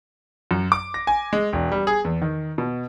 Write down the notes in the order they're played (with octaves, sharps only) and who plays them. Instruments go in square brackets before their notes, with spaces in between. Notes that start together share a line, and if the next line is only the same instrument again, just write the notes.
[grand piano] F#2
D6
A#6
G#5
G#3
E1
G3
G#4
E2
D#3
B2